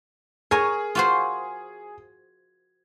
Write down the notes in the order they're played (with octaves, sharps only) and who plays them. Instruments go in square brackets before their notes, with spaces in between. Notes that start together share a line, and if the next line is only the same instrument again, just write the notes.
[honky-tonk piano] G#4 [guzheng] A#4 C#5 G#5
[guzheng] F4 F#4 C5